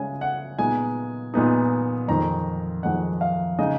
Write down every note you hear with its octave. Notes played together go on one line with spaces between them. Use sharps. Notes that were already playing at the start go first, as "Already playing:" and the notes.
Already playing: C#3 G#3 C#4 G#5
F#5
A#2 G#3 B3 D#4 G#5
A#2 G#3 B3 D#4
F2 D#3 G#3 A#5
F2 D#3 G#3 F#5
F5
C#3 G#3 D#4 D#5